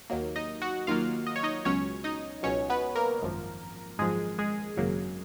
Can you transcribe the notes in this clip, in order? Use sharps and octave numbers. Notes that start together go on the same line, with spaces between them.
D#2 D#3 F#3 A#3
D#4 D#5
F#4 F#5
D#2 D#3 F#3 A#3 F4 F5
D#5
C#5
D#4 D#5
C#2 B2 F#3 C#4 C#5
D#4 D#5
C#2 B2 F#3 C#4 C#5
B3 B4
A#3 A#4
G#1 F#2 F3
G#1 F#2 F3 G#3 G#4
G#3 G#4
G#1 F#2 C#3 F#3 A#3